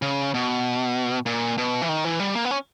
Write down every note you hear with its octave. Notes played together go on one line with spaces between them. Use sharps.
C#3
B2
A#2
B2
E3
D#3
E3
G3
A#3
B3
C#4